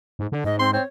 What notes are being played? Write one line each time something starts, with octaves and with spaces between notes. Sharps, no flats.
G#2
D3
G#2 D#5
C4 C6
C4 C#5